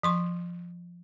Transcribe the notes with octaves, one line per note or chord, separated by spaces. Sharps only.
F3 C6 C#6